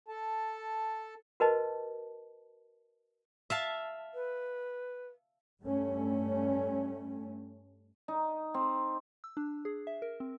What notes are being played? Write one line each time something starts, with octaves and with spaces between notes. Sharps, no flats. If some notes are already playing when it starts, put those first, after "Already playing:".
A4 A5
F#4 A#4 B4 D#5 A5
E5 F5 A5
B4
G2 G3 A3 C#4
D#4
C4
E6
D4
G#4
E5
A#4
C4